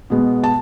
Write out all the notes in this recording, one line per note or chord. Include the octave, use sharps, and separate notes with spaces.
B2 G#3 B3
A5